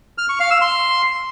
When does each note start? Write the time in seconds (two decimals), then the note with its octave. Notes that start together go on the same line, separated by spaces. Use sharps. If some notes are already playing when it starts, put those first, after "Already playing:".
0.18 F6
0.29 C#6
0.40 F5
0.51 E6
0.61 C6